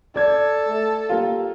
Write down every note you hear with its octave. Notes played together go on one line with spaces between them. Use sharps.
A4 D5 G#6
A3
A#3 F4 G4